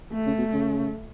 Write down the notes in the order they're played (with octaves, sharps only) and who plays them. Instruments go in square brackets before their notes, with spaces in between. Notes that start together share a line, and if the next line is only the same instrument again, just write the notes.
[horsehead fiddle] A3
[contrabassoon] C#3
B2
C#3